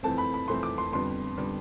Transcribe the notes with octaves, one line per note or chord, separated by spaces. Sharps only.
F2 E3 A3 C4 A5
B5
B5
F2 E3 A3 C4 C6
D6
C6
F2 D3 G3 B3 C6
D3 G3 B3